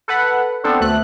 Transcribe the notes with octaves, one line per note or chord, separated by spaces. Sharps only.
A4 B4 F#5 B5
B3 C4 D4 A4 C5
D2 A3 F#6